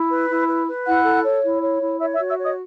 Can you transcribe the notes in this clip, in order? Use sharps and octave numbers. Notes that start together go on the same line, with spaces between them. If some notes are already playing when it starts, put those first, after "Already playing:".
Already playing: E4
B4
E4
B4
B4
E4 F#5 F#6
A4
C#5
E4
C#5
E4
C#5 E5 E6
E5 E6
F#4
E5 E6
C#5
D#5 D#6